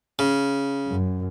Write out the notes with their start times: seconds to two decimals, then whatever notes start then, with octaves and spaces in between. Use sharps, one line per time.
0.19 C#3
0.87 F#2